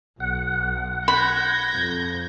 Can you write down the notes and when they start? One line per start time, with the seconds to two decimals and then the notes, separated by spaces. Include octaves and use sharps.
0.20 B1 F#5
1.08 B5 G6 G#6 A#6
1.73 F2